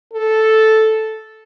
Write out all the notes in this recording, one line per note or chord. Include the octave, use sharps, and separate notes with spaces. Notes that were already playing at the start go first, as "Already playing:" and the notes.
A4